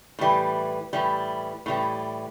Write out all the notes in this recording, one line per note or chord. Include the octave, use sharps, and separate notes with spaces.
A2 E3 G3
A2 E3 G3
A2 E3 G3